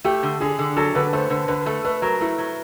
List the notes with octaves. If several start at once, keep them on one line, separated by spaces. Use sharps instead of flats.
A3 G4
D3
D3 G#4
D3
F#3 A4
D3 B4
A3 C5
D3 B4
D3 B4
A3 A4
A3 B4
F#3 A#4
A3 E4
F#3